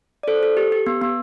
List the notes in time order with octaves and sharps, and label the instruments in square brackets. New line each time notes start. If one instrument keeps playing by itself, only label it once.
[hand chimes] D5
A4 C5
A4
G4
G4
B3
B3